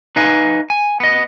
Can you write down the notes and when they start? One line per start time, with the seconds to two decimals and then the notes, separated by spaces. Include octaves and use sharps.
0.16 D#4 B4 D#5 F5 G#5
0.70 G#5
1.00 B3 D#5